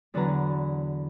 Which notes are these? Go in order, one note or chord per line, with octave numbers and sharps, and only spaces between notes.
E2 D3 F#3 B4 A#5